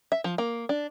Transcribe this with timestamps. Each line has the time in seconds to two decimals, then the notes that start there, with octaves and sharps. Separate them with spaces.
0.12 E5
0.24 F3
0.38 A#3
0.69 D4